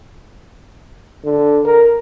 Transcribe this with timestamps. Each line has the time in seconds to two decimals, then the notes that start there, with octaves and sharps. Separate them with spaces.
1.25 D3
1.65 A#4